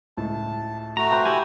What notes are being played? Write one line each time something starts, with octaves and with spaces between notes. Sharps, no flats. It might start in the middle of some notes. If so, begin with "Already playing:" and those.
C#2 A2 A5
A3 F#4 A#5
B4 C5 G5 A5 B5
E4 G4 G#5